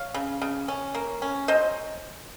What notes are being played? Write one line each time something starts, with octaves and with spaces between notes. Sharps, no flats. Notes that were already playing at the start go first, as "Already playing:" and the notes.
Already playing: C#5 F5
C#3
C#3
C#4
A#3
C#4
F#3 C5 D#5